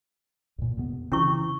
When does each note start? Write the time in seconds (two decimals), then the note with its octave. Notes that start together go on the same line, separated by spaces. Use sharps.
0.58 F2 A#2
0.77 F2 C3 B3
1.12 C#3 E3 C#4 E4 C#6